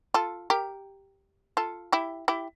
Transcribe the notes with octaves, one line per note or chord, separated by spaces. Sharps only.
F4 A4
G4 A#4
F4 A4
E4 G4
E4 G4